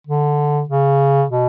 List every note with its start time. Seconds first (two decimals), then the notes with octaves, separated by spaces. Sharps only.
0.07 D3
0.69 C#3
1.30 B2